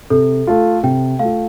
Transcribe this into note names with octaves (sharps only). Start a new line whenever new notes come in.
C3 A4
A3 F4
C3 G5
A3 F5
F4